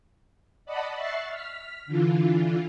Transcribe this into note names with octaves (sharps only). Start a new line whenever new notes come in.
D5 D#5 F#5 A5 B5
E5 C#6 F#6 A6 C7
F6 B6
D3 E3 F4